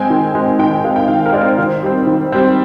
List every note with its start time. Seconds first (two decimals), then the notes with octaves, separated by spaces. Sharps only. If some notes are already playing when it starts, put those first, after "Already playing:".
Already playing: G#3 C4 G5 G#5
0.10 D#3
0.35 G#3 C4
0.59 D#3 G5
0.71 G5
0.84 G#3 C4 F5
0.96 G5
1.08 D#3 F5
1.26 A#4
1.33 G#3 C4 D5
1.41 C5
1.58 D#3
1.83 G3 C4
2.07 D#3
2.32 G3 C4